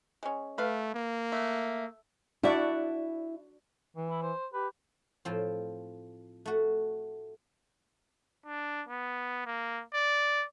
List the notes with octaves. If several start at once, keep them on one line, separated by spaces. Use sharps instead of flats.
G#3 C#4
A3 B4 F5
A#3
A3
D4 E4 F#4 D5 E5
E3
E4
C5
G4 B4
A2 F3 C4
A3 F#4
D4
B3
A#3
D5